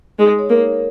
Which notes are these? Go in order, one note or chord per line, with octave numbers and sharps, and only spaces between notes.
G#3 D#4
C#5
A#3
A#4